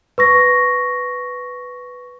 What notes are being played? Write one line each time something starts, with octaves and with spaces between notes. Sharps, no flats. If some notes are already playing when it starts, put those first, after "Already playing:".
B4 C#6 A#6